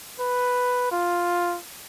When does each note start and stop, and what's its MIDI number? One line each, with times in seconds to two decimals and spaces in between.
0.20 0.91 71
0.91 1.57 65